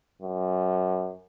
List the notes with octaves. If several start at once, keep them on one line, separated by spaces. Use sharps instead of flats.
F#2